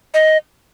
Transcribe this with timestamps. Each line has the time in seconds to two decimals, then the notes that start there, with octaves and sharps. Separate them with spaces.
0.14 D#5